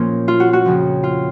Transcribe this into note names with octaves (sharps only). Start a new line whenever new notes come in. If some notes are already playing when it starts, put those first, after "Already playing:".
Already playing: A#2 F3 A#3 C#4
F4
F#4
F#4
F2 C#3 F3
F4